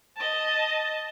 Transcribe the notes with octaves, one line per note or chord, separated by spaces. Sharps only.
D#5 A5